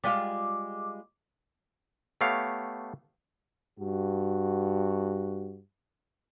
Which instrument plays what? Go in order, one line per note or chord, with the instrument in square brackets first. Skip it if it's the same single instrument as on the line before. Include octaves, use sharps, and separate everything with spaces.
[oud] G3 G#3 F4 [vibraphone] D6
[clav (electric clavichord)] A3 B3 G4 C#5 F5
[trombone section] G2 F#4